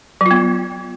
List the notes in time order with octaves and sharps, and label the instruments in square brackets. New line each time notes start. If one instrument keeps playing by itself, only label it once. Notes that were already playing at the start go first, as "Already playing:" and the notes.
[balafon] F#3
F4
B3